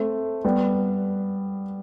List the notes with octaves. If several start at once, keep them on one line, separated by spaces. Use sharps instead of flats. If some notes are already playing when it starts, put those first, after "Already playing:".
Already playing: A3 C4
G3 B3